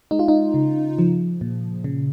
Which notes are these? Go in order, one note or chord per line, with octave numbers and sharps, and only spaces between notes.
G#3 D#4
F4
D#4
C#3
F3
A#2
C#3